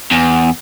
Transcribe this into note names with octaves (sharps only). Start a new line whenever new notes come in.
E2